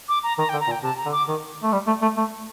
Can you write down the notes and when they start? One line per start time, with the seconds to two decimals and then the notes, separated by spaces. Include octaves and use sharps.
0.09 D6
0.23 A#5
0.38 D#3 A#5
0.49 G5
0.53 D3
0.60 A#5
0.67 A#2
0.71 G5
0.83 C3 A5
0.98 A#5
1.05 D3
1.12 D6
1.28 D#3
1.63 A3
1.72 G3
1.87 A3
2.02 A3
2.17 A3